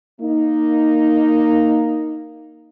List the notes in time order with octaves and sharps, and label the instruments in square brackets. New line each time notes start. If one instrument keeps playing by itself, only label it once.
[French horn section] A#3 D#4